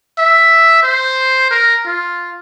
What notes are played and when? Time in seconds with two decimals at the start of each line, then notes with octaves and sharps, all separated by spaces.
0.19 E5
0.83 C5
1.51 A#4
1.86 F4